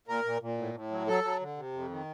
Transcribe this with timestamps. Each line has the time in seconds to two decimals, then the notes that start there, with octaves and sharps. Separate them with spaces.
0.08 A#2 A#4
0.25 A#2
0.41 A#2
0.58 A2
0.74 A2
0.91 F#3
1.07 F#3 A4
1.24 F#3
1.41 D3
1.57 C3
1.73 F2
1.90 D#3